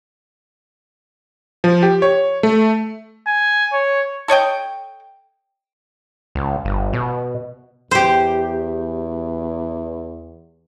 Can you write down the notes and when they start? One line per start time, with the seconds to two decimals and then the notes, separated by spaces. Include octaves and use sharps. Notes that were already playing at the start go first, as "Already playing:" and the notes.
1.64 F3
1.83 G4
2.02 C#5
2.43 A3
3.27 G#5
3.73 C#5
4.28 A4 C#5 D#5 G5
6.35 C#2
6.65 G1
6.93 B2
7.91 E2 G4 C5